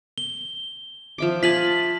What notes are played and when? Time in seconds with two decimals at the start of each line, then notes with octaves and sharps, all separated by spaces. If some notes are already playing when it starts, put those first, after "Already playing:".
0.18 G7
1.18 F3 E5 D6
1.43 F4 G#5 A5 B6 F#7